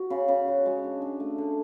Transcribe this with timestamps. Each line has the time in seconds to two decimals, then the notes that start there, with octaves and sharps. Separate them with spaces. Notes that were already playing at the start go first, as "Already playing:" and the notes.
Already playing: F#4
0.10 C#3
0.28 C#3
0.48 F#4
0.66 G#3
0.84 D4
1.02 D4
1.20 A3
1.38 D3